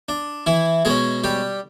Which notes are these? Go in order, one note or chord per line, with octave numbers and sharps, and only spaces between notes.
D4
E3 E4
B2 G#3 C#4 G#4
G3 G4